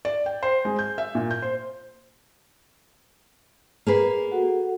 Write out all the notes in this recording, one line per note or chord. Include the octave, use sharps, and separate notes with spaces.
D5
G5
C5
G#3
G6
E5
A#2
G6
C5
A#3 G#4 B4
F#4 A4 F#5